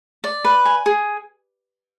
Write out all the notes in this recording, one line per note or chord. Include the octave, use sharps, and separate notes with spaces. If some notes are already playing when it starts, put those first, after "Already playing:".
D5
B4
G#5
G#4